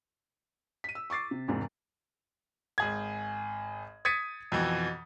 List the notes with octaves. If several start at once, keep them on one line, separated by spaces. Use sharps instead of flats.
B6 D#7
E6
C#6 D6 A6 C7
C3
E1 E2 G#2 C3
G#1 G#4 G#6
D#6 G#6 A6 B6 C#7 D#7
F2 B2 E3